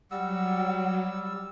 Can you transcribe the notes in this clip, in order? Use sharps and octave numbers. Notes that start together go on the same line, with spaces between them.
F#3 G3 F#5 E6